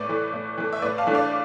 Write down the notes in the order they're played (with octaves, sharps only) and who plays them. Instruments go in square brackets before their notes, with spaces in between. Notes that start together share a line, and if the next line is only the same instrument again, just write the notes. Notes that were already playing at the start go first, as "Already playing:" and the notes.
Already playing: [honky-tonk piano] A2 B4 D5
E3 A3
A2
E3 A3
E5
A2 B4 D5
F5 A5
E3 A3 D4
D5 F5